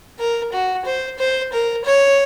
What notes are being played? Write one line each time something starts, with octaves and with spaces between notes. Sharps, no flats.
A#4
F#4
C5
C5
A#4
C#5